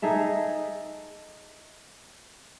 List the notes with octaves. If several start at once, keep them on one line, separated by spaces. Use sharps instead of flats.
D#4 G#4 A4 E5